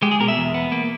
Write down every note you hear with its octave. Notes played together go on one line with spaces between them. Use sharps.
G#3 G4
G#4
B2 A#4
E5
E2
B3
A#3